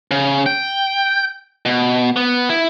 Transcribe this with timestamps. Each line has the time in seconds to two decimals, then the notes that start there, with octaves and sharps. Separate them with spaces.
0.11 C#3
0.46 G5
1.66 B2
2.16 B3
2.49 E4